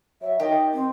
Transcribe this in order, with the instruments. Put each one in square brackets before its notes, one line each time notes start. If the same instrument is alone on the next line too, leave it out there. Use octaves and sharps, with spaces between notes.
[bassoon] F#3 [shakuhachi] E5
[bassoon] D#3 [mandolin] G4 [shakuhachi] D#5
[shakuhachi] C4